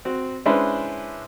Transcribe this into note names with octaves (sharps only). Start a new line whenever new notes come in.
C4 F#4
G#3 C#4 D4 E4 B4 C5